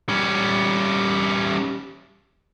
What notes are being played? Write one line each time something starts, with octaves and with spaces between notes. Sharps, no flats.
G3 C#4